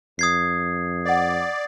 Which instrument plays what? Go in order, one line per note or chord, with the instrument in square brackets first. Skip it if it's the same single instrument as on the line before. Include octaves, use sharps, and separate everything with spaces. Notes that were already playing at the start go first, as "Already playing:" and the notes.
[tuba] F2 [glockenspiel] D#6 G#6 C7
[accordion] D5 [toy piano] D#5 F#5